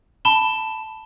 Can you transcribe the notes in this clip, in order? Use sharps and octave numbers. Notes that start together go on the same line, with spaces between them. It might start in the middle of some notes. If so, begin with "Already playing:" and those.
A5 B5 E7 G7